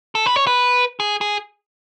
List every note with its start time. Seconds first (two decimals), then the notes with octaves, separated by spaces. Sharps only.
0.15 A4
0.26 B4
0.36 C#5
0.47 B4
1.00 G#4
1.21 G#4